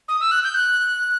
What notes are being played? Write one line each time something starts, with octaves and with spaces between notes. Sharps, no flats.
D#6
E6
F#6
G6
F#6